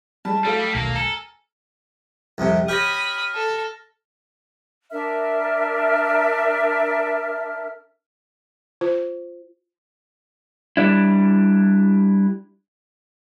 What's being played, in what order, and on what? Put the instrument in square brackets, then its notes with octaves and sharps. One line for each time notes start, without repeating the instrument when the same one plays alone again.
[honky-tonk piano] G3 G#3 [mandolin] A5
[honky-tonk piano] F#3 A3 F5 [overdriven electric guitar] G3
[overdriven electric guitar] G3
[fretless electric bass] D#1 B1 [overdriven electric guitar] A#3 A#4
[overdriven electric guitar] A4 [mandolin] A#4 G#5
[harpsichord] C2 F2 C3
[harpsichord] G4 C#5 [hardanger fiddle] B5 D#6 [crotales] F6 A#6
[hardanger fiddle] A4
[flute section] D4 A#4 E5 F6
[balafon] F4 C5
[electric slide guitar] G3 D4 E4